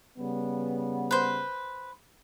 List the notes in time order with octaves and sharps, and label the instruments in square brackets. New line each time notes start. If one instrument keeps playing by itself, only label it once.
[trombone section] C#3 G3 B3
[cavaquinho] B4 C5